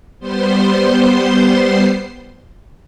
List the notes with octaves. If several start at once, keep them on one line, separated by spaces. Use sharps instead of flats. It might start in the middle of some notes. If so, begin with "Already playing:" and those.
G3 B3 C5 C6